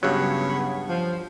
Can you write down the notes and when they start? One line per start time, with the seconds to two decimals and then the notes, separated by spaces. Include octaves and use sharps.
0.03 G2 C#3 F#3 B3
0.89 F3